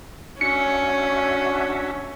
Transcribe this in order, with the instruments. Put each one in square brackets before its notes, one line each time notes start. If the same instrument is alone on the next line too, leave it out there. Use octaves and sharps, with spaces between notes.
[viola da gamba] C#4 [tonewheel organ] D4 F#4 E5 [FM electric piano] C#7